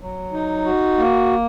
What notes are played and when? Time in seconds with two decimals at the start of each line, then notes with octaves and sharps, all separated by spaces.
0.01 F#3
0.33 D#4
0.65 F#4
0.98 A#3